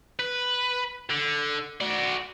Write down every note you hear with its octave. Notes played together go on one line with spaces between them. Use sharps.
B4
D3
F#4 D5